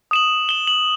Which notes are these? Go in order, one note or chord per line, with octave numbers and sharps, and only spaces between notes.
D#6 E7 F#7
E7 G7
F#7